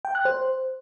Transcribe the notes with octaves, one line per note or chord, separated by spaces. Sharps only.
G5
F#6
C5